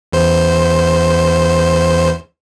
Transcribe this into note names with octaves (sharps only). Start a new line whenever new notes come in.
E2 C5